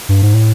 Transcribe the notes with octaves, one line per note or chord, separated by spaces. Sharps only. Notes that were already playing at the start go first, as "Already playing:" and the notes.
G2
G#2
A2